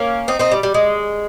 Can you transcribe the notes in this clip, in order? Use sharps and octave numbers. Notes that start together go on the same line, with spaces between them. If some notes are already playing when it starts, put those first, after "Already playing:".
Already playing: A#3 C#4
C4 D#4
C4 D#4
G3
G3
G#3